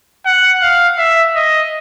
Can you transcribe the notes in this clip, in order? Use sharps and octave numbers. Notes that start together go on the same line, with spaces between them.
F#5
F5
E5
D#5